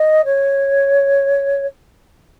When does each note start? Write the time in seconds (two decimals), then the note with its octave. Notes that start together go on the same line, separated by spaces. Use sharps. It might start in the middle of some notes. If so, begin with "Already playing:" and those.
Already playing: D#5
0.25 C#5